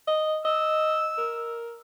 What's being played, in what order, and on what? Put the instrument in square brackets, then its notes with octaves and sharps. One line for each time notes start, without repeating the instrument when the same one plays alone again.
[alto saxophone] D#5
[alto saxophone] D#5 [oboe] E6
[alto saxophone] A#4